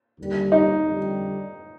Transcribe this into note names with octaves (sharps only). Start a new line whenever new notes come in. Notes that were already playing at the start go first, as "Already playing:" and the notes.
D#2 D3 G3
D#4
F2 D3 G3